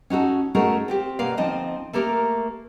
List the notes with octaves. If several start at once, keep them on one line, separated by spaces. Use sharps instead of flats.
C#4 D#4 F#4 A4
A3 C#4 D#4 F#4 G#4 A#4
C4 F4 G4
B2 A#3 D5 F5
D2 F3 C4 D#4 D#5 A5
A3 A#3 G4 A#4